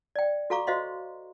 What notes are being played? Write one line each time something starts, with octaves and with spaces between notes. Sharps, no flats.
D5 G5
F#4 A4 F5 A#5 C#6 D6
F#4 C5 D#5 F5 C6